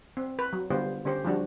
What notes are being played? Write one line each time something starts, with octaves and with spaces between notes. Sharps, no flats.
C4
B4
F#3
D3 G3 B3 F4 G4 C5
D3 C#4 G4 C5
F3 G3 D4 F#4